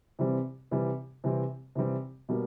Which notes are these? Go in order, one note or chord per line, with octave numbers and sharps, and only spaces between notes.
C3 E3 G3 C4
C3 E3 G3 C4
C3 E3 G3 C4
C3 E3 G3 C4
B2 G3 A#3